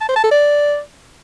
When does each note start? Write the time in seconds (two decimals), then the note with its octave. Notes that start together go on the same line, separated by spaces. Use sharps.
0.01 A5
0.08 C5
0.16 A5
0.24 A4
0.31 D5